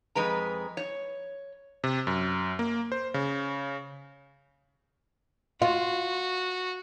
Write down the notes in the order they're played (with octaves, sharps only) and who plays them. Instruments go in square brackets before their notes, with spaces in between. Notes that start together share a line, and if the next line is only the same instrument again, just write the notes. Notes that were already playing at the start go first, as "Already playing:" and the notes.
[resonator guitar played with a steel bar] F2 G#3 B4 A#5
C#5
[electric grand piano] C3
F#2
A#3
C5
C#3
[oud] F4 [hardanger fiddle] F#4